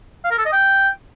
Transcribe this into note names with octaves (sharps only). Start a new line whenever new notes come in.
F5
A#4
A4
D#5
G5